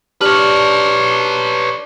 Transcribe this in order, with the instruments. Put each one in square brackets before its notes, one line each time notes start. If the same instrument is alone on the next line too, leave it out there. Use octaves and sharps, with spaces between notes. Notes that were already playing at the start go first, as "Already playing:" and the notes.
[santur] D4 [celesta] G4 F6 F#7 [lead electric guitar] B4 C#5